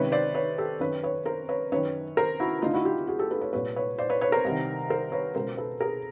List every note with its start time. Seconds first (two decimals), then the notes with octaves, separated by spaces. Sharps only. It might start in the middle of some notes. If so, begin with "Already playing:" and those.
Already playing: C#2 C3 D#3 B4 C#5
0.12 C5 D5
0.35 B4 C#5
0.58 G4 A4
0.80 F#2 D#3 B4 C#5
1.03 B4 C#5
1.25 A#4 C5
1.49 B4 C#5
1.72 F#2 D#3 B4 C#5
2.17 A#4 C5
2.40 E4 F#4
2.62 D2 D#4 F4
2.66 D3
2.73 E4 F#4
2.85 F4 G4
3.07 F#4 G#4
3.19 G4 A4
3.31 A4 B4
3.41 B4 C#5
3.53 C2 A#2 B4 C#5
3.76 B4 C#5
3.98 C5 D5
4.10 B4 C#5
4.21 B4 C#5
4.32 A#4 C5
4.45 C2 C3 D#3
4.90 A#4 C5
5.12 B4 C#5
5.35 C#2 B2 A#4 C5
5.57 A4 B4
5.81 G#4 A#4